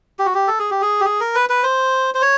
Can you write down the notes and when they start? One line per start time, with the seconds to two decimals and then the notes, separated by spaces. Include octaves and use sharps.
0.19 G4
0.26 F#4
0.35 G4
0.48 A4
0.59 G#4
0.71 G4
0.82 G#4
1.00 G4
1.05 G#4
1.21 A#4
1.35 B4
1.49 B4
1.63 C5
2.14 C5
2.22 C#5